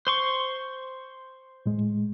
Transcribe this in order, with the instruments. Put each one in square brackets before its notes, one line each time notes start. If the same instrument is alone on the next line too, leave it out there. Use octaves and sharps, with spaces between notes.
[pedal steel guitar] C5 C6 C#6
[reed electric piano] A2 G#3